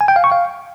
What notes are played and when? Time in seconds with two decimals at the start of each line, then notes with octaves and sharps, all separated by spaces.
0.01 G#5
0.08 G5
0.16 F5
0.24 C#6
0.32 F5